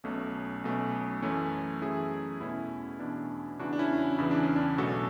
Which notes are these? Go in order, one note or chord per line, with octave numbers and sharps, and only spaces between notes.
B1 B2 A3 C#4
B1 B2 A3 C#4
F#2 E3 A3 C#4
F#2 E3 A3 C#4 E4 G#4
E2 B2 A3 C#4 E4
E2 B2 A3 D4
E2 C#3 E3 D4 F#4
D4
C#4 E4
C#4
E2 C#3 E3 E4
D4
C#4
D4
B1 B2 A3 F#4 A4